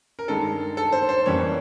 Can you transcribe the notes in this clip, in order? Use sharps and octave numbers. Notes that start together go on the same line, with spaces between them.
A#4
G2 D#3 G#3 A4
A4
C5
C5
F2 C#3 E3 G3 A#3 C#5